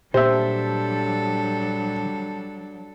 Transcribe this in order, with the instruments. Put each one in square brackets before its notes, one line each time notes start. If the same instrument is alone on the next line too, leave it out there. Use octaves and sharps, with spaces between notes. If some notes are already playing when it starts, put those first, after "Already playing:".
[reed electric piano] A#2 G4 [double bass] F#3 D4 [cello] G3 A4 [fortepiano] C5 E5